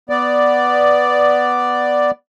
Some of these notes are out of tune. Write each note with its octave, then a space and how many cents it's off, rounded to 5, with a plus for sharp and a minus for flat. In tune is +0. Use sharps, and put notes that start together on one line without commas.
B3 +0 D5 +0